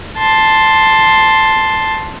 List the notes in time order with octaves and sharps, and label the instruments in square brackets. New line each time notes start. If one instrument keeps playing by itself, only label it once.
[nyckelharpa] A5 C6